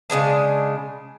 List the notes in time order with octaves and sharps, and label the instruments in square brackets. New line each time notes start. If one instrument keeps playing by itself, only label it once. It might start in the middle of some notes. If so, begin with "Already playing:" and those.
[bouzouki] C#3 E3 G#3 D4